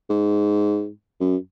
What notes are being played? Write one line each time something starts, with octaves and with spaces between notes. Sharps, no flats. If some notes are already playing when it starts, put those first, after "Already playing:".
G#2
F#2